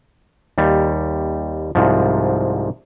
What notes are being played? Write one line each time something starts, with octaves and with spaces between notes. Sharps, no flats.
D#2 G3
C2 G#2 F3